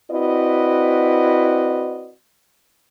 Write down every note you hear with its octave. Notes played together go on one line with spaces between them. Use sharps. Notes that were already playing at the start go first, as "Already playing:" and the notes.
C4 E4 F#4 B4 D5 D#5